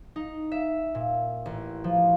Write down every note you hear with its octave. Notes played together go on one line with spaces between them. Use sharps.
D#4
E5
A#2
A1
F3